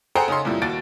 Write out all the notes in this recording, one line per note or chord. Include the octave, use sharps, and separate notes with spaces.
G#4 A4 C5 F#5 G5 A#5
C#3 C#4 D#4 A4 C6
F2 A#2 G3 E4
D#2 F#4 A6 D7